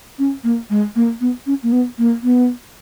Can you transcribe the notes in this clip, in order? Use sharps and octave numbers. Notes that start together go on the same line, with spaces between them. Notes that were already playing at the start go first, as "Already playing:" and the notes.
C#4
A#3
G#3
A#3
B3
C#4
A#3
B3
A#3
B3